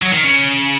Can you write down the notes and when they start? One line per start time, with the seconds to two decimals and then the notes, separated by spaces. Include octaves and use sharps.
0.02 F#3
0.12 D#3
0.24 C#3